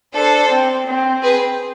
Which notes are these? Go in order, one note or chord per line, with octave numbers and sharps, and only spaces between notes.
D4 A4 C5
C4
C4
G#4 B4